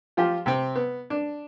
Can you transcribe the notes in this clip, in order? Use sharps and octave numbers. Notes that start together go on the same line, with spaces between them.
F3 F4 G4
C3 C4
B3
D4